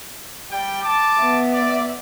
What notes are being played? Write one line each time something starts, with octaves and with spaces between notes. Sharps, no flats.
G3 G5
A5 D6
B3 E5
D5 D6